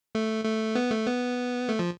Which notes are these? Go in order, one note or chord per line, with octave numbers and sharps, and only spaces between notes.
A3
A3
B3
A3
B3
A3
F3